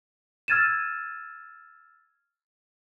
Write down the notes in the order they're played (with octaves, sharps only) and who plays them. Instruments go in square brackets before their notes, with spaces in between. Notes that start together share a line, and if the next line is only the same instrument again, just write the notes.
[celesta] E6 F6 G#6 A6 D#7 E7